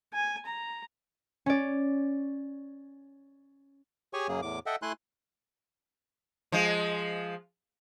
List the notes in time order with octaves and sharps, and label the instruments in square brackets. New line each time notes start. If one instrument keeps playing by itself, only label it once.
[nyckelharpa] G#5
A#5
[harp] C#4 D5
[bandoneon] G4 G#4 C#5 G#5 C#6
F#2 C#3 F#3 A#3 G#4
E2 A2 D6
A4 D#5 E5 F#5 G5
A3 E4 G#5 C6 F#6
[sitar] F3 G#3